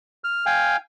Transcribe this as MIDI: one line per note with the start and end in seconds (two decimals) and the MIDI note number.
0.24 0.46 89
0.46 0.77 77
0.46 0.77 79
0.46 0.77 80